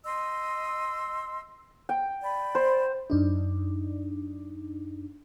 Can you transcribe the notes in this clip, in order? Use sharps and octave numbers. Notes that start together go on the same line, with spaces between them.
D#5 C6 E6
G5
D5 B5
C5
F#2 D4 D#4